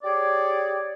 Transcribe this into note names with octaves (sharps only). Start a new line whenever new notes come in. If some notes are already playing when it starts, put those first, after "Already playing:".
G4 G#4 C#5 D5